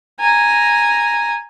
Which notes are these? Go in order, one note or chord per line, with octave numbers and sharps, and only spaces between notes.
G#5 A#5